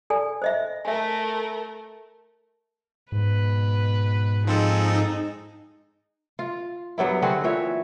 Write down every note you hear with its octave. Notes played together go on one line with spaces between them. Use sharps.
A4 D5 G#5
C5 D#5 E5
A3 A#4 E5 G#5
G#2 B2 B4
F3 G#3 C4 D#4 G#4 A4
F4
G2 F#3 B3 E4
D3 C4 F#4 G#4
A#2 E3 C#5 E5